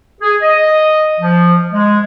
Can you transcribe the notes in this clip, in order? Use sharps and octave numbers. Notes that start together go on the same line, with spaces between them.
G#4
D#5
F3
G#3